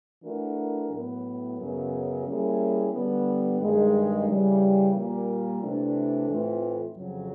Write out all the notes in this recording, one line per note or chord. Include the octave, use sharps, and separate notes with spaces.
E3 A3 D4 F#4 A#4
A2 F#3 B3
F#2 C#3 F#3 B3
G3 A#3 C#4 E4 G#4
D3 G3 B3
G2 D#3 G#3
C#3 E3 G3
A#2 G3 A#3
C3 E3 A3 D4
A2 E3 A3 C4 F4
F2 C#3 F#3